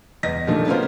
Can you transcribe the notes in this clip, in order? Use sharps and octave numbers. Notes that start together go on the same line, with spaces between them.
E2 D#5 A#6
A#2 D3 D#3 F3 G3 A3
A#3 B3 C#4 F4 A#4 C5